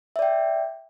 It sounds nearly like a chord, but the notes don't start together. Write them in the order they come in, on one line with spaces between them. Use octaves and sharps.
E5 D5 G5